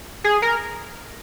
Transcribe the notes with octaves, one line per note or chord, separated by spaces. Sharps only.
G#4
A#4